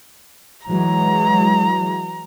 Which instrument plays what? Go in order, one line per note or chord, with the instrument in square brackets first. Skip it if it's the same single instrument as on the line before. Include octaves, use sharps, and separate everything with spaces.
[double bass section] E3 F#3 G#3 [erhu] A#5